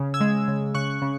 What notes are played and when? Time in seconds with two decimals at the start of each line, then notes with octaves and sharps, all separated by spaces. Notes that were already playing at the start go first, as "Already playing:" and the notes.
Already playing: C#3
0.14 E6 G#6
0.21 G#3
0.48 C#3
0.75 C#3 C#6 F#6
1.02 C#3